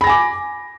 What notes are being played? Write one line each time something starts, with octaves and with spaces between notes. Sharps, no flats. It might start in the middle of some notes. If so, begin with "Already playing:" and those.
G#5 B5 D6 A#6